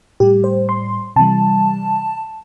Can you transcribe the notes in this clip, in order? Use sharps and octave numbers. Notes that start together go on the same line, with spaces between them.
A2 G3 G4
C5
C6
C3 E3 G3 A5